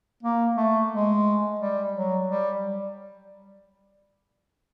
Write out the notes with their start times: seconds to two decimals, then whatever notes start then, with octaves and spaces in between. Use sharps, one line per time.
0.23 A#3
0.57 A3
0.91 G#3
1.59 G3
1.93 F#3
2.28 G3